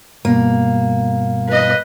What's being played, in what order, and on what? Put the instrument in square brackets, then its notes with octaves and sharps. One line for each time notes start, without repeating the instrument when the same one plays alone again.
[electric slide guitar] G2 B2 [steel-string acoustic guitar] A#3
[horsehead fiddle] B4 D#5